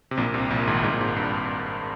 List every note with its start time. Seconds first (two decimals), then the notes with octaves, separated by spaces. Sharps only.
0.11 C3
0.17 A#1 A#2
0.34 C2 C3
0.50 A#1 A#2
0.67 G#1 G#2
0.83 G#1 G#2
0.92 A#2
1.00 G#1 G#2
1.16 G2